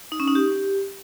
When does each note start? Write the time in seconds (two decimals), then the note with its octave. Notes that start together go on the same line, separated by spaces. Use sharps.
0.12 D#4
0.20 C#4
0.27 D#4
0.35 G4